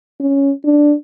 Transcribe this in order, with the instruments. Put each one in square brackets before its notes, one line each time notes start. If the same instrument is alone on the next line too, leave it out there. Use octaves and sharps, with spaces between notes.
[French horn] C#4
D4